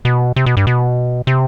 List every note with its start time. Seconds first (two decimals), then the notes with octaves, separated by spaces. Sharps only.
0.05 B2
0.36 C3
0.46 B2
0.57 G2
0.67 B2
1.27 C3